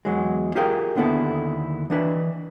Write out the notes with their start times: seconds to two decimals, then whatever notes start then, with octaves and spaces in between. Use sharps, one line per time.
0.05 E2 F#3 G#3
0.55 F4 G4 G#4 A#4 F5 G5
0.95 D#2 D3 B3 E4 A4
1.90 E3 D4 B4